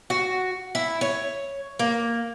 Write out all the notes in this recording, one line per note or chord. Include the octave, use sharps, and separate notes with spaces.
F#4
E4
C#5
A#3